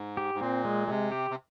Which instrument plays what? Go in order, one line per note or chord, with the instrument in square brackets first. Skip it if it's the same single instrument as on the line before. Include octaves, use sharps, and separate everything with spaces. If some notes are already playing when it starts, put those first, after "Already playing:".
Already playing: [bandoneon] G#2
[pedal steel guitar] G4
[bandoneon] G#2
[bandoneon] A#2 [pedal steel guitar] C4
[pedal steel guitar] G#3
[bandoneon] C3 [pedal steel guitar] G#3
[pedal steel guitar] G4
[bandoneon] C3